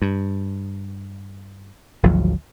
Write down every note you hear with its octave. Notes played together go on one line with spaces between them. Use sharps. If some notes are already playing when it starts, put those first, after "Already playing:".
G2
G#1 D2 F3 F#3